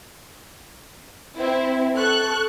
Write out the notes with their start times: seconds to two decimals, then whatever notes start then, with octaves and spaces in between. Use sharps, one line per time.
1.38 C4 E4
1.97 A4 C#6 F#6